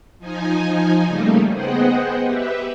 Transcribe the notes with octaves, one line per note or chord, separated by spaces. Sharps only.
F3 D#4 G#5
C#3 G3 A3 A#3 D#4
B3 G#4 C5 D#5 F#5 G5
G4 B4 E5